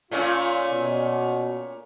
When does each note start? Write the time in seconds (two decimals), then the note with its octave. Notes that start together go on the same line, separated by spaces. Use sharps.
0.11 A#2 A3 C#4 F4
0.71 B2